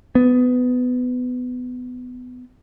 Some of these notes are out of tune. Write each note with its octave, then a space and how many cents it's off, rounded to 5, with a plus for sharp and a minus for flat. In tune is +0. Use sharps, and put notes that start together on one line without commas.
B3 +20